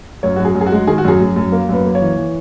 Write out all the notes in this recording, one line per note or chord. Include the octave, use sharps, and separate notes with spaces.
F#2 C#5
F#2 F#4
G#4
F#2
G#4
F#4
G#3
D#3 G#4
F#4
F#2 G#4
F#2
F#2
A#3 A#4
F#2 B4
A#3
C#5
E3
E3